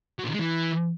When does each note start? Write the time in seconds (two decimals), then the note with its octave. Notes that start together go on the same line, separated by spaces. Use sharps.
0.19 F#3
0.24 A#2
0.29 D#3
0.34 G#3
0.39 E3